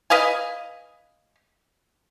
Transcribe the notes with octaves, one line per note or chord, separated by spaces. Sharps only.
B4 D#5 F5 G#5